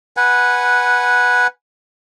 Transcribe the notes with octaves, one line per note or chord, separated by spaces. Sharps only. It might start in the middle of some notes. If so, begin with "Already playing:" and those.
B4 F#5 G#5